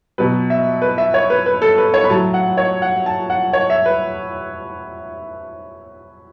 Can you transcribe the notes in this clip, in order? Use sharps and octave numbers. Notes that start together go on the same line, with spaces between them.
B2 F#3 B4
E5
B4
E5
C#5
B4
B4
A4
B4
C#5
B5
A2 F#3 A5
F#5
C#5
F#5
A5
F#5
C#5
E5
B4